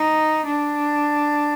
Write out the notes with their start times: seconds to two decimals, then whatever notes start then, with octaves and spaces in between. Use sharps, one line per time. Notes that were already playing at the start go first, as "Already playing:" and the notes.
Already playing: D#4
0.46 D4